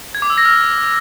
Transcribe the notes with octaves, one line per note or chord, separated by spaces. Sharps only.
G#6
D6
E6
A#6
F6